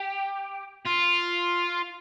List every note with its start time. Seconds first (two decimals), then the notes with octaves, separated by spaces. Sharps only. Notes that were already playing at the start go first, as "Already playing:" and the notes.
Already playing: G4
0.85 F4